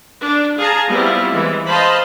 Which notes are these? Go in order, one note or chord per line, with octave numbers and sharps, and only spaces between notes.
D4
G#4 F5 A5 A#5
G3 B3 C4 E4 F4
E3 G#3
C5 D#5 F5 A5 B5 C6